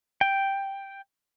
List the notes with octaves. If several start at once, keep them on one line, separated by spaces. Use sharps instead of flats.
G5